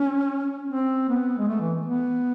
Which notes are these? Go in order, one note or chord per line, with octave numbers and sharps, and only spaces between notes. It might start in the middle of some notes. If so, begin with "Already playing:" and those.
Already playing: C#4
C4
B3
G#3
A3
E3
B3